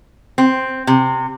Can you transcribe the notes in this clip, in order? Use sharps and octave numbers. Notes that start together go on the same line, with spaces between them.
C4
C3